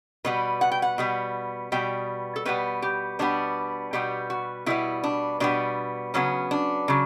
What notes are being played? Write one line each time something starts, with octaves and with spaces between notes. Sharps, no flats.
B2 G3 B3 B4
F#5
G5
F#5
B2 G3 B3
B2 G3 B3 G5
A4
B2 G3 B3 B4
G4
B2 G3 B3 D4
B2 G3 B3 G4
F#4
B2 G3 B3 E4
D4
B2 G3 B3 D4
C#3 F#3 B3 C#4
D4
C#3 F#3